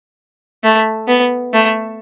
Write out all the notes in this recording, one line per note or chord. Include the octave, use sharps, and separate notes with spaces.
A3
B3
A3